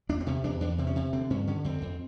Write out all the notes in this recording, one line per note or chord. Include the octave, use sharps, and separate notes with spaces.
E2 D4
C4
C3 C#4
E2 D4
E2 D4
C3 C4
C#4
C3
D3 C4
G2 C#4
D3 C#4
F2 C4
F2